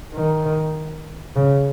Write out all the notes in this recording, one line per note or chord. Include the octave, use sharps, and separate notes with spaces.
D#3
C#3